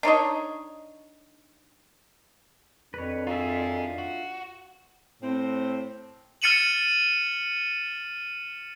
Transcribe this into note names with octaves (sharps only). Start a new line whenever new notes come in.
D4 D#4 C#5 D#5
F2 D#3 F#3 D4 B4 C#5
D#4 F4 G#4 E5
F#4
A2 C4
F6 A6 C#7 D#7 E7 F#7